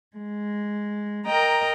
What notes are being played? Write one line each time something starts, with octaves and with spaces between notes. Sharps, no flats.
G#3
A#4 D#5 G5 A#5